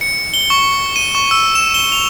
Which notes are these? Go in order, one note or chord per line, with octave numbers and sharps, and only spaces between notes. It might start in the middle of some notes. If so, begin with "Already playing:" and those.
C#7
G7
C#6
D#7
C#6
E6
E7
G7
F7